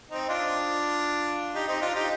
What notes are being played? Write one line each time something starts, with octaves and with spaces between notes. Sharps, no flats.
C4 D#4
D4 F4
D#4 G4
C4 D#4
D4 F4
D#4 G4